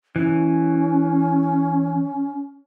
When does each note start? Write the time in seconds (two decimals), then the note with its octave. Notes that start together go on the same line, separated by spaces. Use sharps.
0.16 E3 C#4